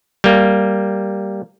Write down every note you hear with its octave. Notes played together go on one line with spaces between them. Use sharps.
G3 A#3